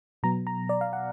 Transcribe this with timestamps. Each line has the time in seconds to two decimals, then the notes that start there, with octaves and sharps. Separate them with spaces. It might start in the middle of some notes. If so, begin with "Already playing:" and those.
0.23 B2 F#3 B3 A#5
0.47 A#5
0.69 D5
0.81 F5
0.93 F#5